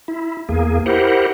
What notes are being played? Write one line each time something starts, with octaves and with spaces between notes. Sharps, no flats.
E4
E2 A#3 G#4
E4 G4 A#4 C5 F#5